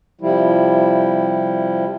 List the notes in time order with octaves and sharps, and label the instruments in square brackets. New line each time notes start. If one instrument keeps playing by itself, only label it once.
[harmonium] C3 F3 G3 E4